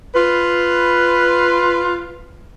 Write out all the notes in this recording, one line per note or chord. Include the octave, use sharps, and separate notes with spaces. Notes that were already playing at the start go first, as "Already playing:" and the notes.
F4 B4